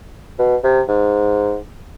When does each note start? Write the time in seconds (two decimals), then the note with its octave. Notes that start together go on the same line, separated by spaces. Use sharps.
0.39 B2
0.63 C3
0.88 G#2